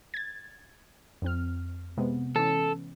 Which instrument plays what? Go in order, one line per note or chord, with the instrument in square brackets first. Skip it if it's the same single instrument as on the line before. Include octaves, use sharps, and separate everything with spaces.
[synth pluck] G#6 A6
F2 C4 F6
C3 G#3 B3
[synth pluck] E3 C#4 [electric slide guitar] A4